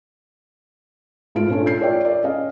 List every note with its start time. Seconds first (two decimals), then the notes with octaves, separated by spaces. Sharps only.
1.35 G#2 A3 F4 D7
1.50 C#4 D4 F4 A4 C#5
1.66 G6 C7
1.80 F4 A#4 C#5 D5 E5 G5
2.05 D5
2.24 C#4 D#5 F5